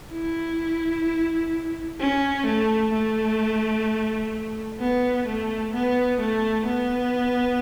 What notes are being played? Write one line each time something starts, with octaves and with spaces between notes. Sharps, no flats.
E4
C#4
A3
A3
B3
A3
B3
A3
B3